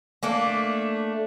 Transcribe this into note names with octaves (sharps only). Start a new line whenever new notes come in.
A3 A#3 D4